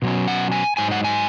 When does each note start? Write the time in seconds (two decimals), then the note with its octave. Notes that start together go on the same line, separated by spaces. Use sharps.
0.02 B2 F#3 C#4
0.28 F#5
0.52 G#5
0.77 G#2 F#3 D#4 G#5
0.91 F#5
1.04 G#5